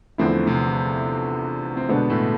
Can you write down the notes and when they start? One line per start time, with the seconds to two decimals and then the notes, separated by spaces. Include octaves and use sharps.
0.18 E2 D3 F3 A3 C4 E4
0.46 C3 C4
1.77 C4
1.89 B2 D3 G#3 B3 D4
2.10 A2 A3